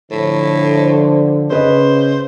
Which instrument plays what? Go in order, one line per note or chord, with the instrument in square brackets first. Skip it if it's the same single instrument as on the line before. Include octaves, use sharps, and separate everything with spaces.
[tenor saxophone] A2 [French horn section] D3 F3 C5
[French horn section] C#3 [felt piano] C#4 B4 D#5 [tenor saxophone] C5